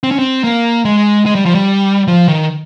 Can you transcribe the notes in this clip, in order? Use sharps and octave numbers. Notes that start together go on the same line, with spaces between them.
C4
C#4
C4
A#3
G#3
G#3
G3
F3
G3
F3
D#3